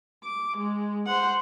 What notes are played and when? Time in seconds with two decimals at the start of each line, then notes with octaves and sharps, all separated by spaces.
0.24 D6
0.57 G#3
1.06 C5 F#5